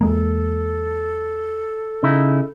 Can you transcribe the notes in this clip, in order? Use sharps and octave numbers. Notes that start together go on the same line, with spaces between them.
E2 G#3 A#3 A4
C#3 D#4 E4